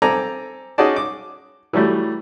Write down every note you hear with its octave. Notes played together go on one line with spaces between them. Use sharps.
C4 A4 D5 G#5 A#5
C#4 D#4 F#4 G#4 D5 A5
D6
E3 F#3 G3 A3